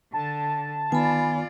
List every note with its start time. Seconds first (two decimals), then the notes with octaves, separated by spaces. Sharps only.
0.13 D3 A5
0.92 D#3 B3 F4 D5 G#5 B5